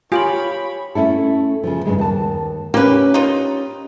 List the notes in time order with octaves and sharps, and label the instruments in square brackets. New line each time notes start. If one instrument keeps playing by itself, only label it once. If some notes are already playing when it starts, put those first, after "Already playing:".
[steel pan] F4 [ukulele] G4 [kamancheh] C#5 B5 [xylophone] G#5 D7 F#7
[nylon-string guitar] A3 C#4 E4 A4
C#3 F3
G2 C#3 G#3
D#2 A5
[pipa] A#3 B4 [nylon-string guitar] C#4 G4
[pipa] D#4 F4